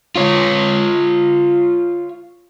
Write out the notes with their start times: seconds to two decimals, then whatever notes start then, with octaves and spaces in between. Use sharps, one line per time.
0.16 F4 C#5